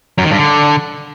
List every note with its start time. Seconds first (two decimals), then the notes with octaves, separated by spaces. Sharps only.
0.18 F#2
0.24 D#3
0.31 G2
0.37 D3